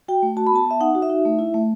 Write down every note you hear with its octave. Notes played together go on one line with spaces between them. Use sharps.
F#4 G5
A3
F#4 A5
B5
B3 A5
B3 E5
D#4 F#5
F#4
E5
D#4
A3
E4
A3